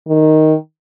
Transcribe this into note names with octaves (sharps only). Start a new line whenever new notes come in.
D#3